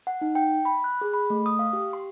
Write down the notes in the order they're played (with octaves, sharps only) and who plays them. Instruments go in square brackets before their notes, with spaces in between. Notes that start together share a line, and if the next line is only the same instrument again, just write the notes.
[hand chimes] F#5
D#4
G5
B5
F#6
G#4
B5
A3
D#6
F5
G4
C6